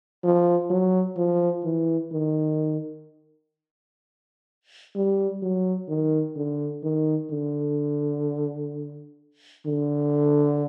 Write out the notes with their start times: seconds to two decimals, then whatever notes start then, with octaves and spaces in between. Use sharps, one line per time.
0.24 F3
0.70 F#3
1.17 F3
1.64 E3
2.12 D#3
4.95 G3
5.43 F#3
5.89 D#3
6.36 D3
6.83 D#3
7.31 D3
9.66 D3